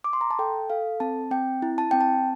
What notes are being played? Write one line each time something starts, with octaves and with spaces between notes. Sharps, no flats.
D6
C6
A#5
A5
A4 G5
A4 F5
C4 A5
C4 G5
E4
A5
C4 G5
A5